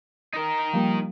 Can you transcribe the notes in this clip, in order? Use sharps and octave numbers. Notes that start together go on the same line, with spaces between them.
D#4 A#4
F3 G3 A#3